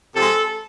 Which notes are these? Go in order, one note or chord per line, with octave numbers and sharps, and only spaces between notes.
C3 F3 G#3 A4